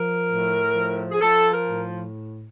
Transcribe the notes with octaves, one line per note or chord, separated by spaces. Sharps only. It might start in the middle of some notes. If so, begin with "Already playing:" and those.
Already playing: F3 A#4
A2
F3
G#4
F3 A4
A#4
A2